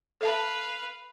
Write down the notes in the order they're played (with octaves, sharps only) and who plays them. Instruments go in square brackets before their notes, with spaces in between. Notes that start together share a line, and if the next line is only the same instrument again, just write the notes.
[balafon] A4 E5 A5 [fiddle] B4 F5